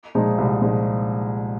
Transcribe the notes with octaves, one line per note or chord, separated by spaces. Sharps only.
A#2 F3 G#3 D#4
C2
A#2 F3 G#3 D#4